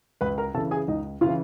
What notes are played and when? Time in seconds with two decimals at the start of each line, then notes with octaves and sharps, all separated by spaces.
0.21 C#2 B4 B5
0.38 A#4 A#5
0.54 C#3 E3 A4 A5
0.71 G#4 G#5
0.88 C#2 D#4 D#5
1.21 C#3 E3 F4 F5